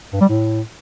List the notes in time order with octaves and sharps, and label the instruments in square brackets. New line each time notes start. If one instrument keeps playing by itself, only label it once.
[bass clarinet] G2
G3
A2